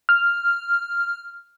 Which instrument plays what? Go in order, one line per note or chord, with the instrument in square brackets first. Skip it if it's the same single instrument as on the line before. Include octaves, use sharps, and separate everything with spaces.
[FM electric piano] F6